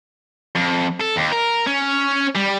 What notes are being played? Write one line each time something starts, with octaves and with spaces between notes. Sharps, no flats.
F2
A4
D#2
A#4
C#4
G3